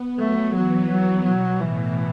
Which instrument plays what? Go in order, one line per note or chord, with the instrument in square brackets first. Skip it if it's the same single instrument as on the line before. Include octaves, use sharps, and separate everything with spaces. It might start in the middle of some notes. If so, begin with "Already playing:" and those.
Already playing: [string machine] B3
[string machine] F#3 [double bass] A3
[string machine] E3 [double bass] F#3
[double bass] F#3
[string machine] B2 [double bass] F#3
[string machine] A2 [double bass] E3